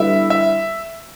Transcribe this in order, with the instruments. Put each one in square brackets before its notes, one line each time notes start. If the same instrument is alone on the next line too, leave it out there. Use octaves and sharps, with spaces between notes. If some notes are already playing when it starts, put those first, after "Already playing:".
Already playing: [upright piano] D3 G3 B3 E4 [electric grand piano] E5
[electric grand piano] E5